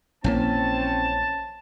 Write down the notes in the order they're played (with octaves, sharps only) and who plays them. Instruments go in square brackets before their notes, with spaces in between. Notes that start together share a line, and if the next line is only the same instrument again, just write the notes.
[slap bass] A#1 E3 A#3 [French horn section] C4 C#4 [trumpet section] A5